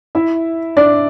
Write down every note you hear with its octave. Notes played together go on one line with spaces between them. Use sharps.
E4 E5
D4 D5